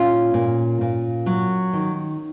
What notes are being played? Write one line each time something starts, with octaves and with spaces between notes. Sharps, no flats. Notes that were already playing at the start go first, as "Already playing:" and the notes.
Already playing: A#2 C#4 F4
A#2
A#2
F#3
D#3